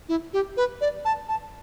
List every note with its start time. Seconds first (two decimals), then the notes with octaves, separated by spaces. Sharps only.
0.09 E4
0.33 G4
0.57 B4
0.81 D5
1.05 A5
1.29 A5